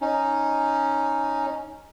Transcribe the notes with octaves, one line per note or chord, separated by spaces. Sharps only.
C#4 D#4